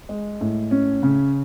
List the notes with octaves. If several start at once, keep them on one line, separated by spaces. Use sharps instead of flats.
G#3
A2
C#4
C#3